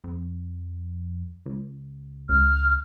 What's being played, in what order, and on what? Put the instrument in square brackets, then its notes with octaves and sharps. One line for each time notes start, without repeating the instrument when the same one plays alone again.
[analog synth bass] F2
C#2
[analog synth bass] C#2 [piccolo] F6